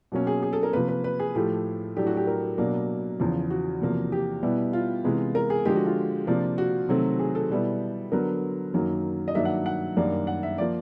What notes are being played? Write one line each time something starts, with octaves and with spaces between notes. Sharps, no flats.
B2 F#3 A#3 C#4
G#4
G#4
A4
A#4
C3 F3 A#3 B4
B4
B4
G#4
A2 F3 A3 G4
A2 F#3 A3 D4 G4
F#4
G4
A#4
B2 F#3 A#3 D4
E2 C#3 F3
F#4
E2 C3 F3 A#3
G4
B2 G3 B3 E4
F4
C3 E3 G#3 B3
A#4
G#4
D3 F3 G#3 G4
F#4
F4
C3 F3 A#3 D4
F#4
C3 D#3 F#3 A3 C4
G#4
A4
B2 G3 B3 E4
D3 F#3 B3 A#4
F#2 D#3 F#3 A#3
D#5
G2 D#3 F#3 A#3 D4 E5
F#5
F#5
F#2 D#3 G3 A#3 D4
F#5
E5
F3 A#3 D5